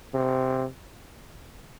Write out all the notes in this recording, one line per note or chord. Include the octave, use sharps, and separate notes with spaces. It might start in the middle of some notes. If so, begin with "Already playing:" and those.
C3